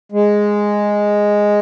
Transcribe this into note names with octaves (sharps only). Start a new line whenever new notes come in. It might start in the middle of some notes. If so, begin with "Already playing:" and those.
G#3